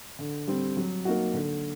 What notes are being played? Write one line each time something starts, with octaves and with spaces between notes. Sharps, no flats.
D3
G3 C4
F#3
A#3 D#4 F#4
D3